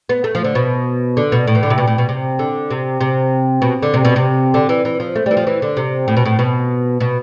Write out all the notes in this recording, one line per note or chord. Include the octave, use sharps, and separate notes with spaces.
B3
A3
F3
D3
B2
D3
B2
A2
E3
D3
C3
B2
A2
B2
C3
D3
C3
C3
B2
D3
C3
B2
C3
D3
E3
E3
F3
A3
E3 G3
F3
E3
D3
C3
A2
B2
A2
B2
B2